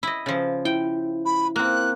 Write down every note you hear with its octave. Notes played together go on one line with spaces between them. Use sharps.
E4 D#5
C#3 F3
E4 G5
B5
A#3 C4 F#6